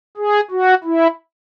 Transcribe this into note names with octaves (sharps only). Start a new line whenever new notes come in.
G#4
F#4
E4